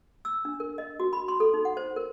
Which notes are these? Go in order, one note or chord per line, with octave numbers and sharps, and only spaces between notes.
E6
D4
A#4
D#5
F#4
B5
C6
A4
D#4
F#5
C5
A#4